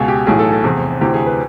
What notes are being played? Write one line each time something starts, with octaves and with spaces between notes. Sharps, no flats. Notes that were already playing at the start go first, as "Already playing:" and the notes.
Already playing: C#2 B2 G#4
G4
B1 A2 E3 G#4
A4
A4
F1 E2 C3 G#4
D2 C3 E3 G4
G#4
B4